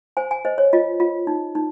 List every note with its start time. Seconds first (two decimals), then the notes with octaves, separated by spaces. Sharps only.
0.17 C5 G#5
0.31 G#5
0.45 C5 D#5
0.58 C#5
0.73 F4 D#5
1.00 F4
1.27 D#4
1.55 D#4